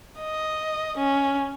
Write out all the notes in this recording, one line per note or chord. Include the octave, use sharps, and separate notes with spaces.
D#5
C#4